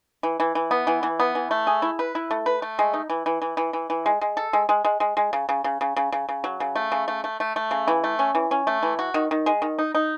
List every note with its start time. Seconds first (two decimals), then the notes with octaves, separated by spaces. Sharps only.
0.23 E3
0.40 E3
0.55 E3
0.71 B3
0.87 E3
1.03 E3
1.20 B3
1.35 E3
1.51 A3
1.67 G#4
1.82 E4
1.99 B4
2.15 E4
2.31 A3
2.46 B4
2.62 A3
2.79 G#3
2.94 D#4
3.10 E3
3.26 E3
3.42 E3
3.57 E3
3.73 E3
3.90 E3
4.06 G#3
4.21 G#3
4.37 A4
4.53 G#3
4.69 G#3
4.84 G#3
5.00 G#3
5.17 G#3
5.33 C#3
5.49 C#3
5.64 C#3
5.81 C#3
5.96 C#3
6.12 C#3
6.29 C#3
6.44 F#3
6.60 C#3
6.76 A3
6.92 C#3
7.08 A3
7.24 A3
7.40 A3
7.56 A3
7.71 C#3
7.88 E3
8.04 A3
8.19 C#4
8.35 E3
8.51 C#4
8.67 A3
8.83 E3
8.99 F#4
9.14 D#3
9.31 D#3
9.46 G#3
9.62 D#3
9.79 D#4
9.95 D#4